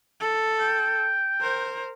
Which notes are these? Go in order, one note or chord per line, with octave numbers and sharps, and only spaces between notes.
A4
G5
A#4 C5